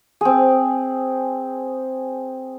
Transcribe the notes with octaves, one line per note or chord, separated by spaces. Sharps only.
C4 G#4